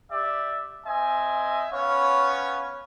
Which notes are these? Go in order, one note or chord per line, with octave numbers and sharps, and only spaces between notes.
G4 D5 E5
C4 D#5 E5 G#5
B3 C#4 C#5 F5